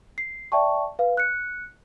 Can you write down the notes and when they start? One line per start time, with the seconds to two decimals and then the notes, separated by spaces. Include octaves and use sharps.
0.18 C7
0.52 D5 E5 G5 A5 C#6
0.99 B4 F5
1.17 F#6 C#7